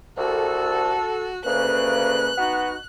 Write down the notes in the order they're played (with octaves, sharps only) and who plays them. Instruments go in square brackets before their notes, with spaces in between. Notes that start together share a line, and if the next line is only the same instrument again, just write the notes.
[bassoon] C2 [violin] F#4 [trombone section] A4
[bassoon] D2 [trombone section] C#3 A#3 [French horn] B4 [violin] F#6
[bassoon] B3 [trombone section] D#4 F#4